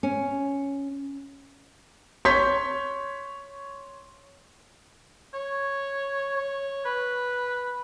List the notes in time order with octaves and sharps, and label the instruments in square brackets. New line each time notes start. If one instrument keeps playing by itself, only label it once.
[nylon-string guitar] C#4
[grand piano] C#5 C6 C#6 G6 B6
[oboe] C#5
C#5
B4